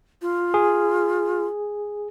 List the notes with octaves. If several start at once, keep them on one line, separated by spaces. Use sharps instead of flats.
F4
G#4